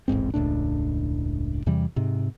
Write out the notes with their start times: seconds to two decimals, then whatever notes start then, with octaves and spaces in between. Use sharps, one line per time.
0.08 D#1 A1 G#2 C4
0.34 E1 C#2 A2 D4
1.66 E2 C3 E3 G3
1.96 G#2 C3